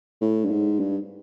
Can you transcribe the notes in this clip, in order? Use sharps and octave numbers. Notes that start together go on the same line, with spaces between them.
A2
G2
G#2
G2